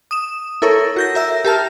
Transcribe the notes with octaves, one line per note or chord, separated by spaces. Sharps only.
D#6 E7
E4 A4 A#4 C#5
F#4 G6 A#6
A#4 E5 E6
G4 A#4 A5 F6